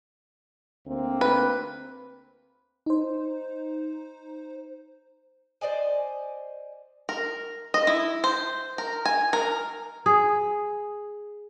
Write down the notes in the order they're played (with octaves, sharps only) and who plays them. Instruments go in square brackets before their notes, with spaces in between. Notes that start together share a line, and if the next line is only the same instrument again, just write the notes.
[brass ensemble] D2 A#3 C4
[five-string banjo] B4
[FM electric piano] D#4 C5
[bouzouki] C5 D5 D#5 G#5
[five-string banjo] A#4
D#5
E4
C5
A#4
G#5
A#4
[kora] G#4